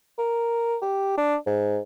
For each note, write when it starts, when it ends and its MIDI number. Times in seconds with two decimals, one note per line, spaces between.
0.18 0.77 70
0.82 1.14 67
1.18 1.36 62
1.46 1.79 44